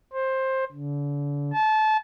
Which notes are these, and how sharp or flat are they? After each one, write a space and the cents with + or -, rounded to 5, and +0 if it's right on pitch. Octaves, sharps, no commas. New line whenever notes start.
C5 +15
D3 -35
A5 -25